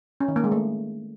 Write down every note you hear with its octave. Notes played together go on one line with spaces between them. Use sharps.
C#4
D#3
A#3
G#3
A3